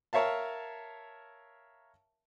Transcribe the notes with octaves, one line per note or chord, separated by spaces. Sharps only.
A#4 C#5 E5 F5 A5